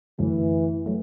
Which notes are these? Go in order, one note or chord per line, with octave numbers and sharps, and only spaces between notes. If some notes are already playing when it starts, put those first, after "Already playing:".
F#2 D3 E3 F#3 A3
F#3 A3